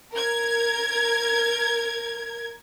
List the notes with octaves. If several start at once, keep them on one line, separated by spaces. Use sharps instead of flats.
A#4 G#6